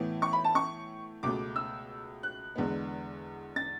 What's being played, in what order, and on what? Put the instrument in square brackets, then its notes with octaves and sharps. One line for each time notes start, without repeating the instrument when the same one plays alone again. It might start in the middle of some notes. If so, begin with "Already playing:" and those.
Already playing: [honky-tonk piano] A2 E3 B3
C#6
B5
A5
C#6
C#2 B2 A3 D6
E6
F#6
E2 D3 G#3 B3
A6